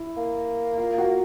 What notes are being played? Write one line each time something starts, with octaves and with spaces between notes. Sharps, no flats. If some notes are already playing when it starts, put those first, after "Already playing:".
Already playing: E4
A#3
F4
F#4